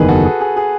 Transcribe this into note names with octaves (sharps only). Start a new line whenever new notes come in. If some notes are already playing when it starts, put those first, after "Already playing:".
Already playing: F#1 E2 D#3 G#4 B4
F#4 A4
G#4
G#4
G#4